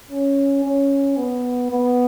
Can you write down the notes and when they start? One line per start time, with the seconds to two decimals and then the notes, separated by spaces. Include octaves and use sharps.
0.11 C#4
0.65 C#4
1.17 B3
1.71 B3